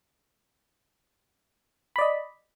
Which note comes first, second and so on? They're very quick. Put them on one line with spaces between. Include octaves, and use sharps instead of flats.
B5 D5 D#5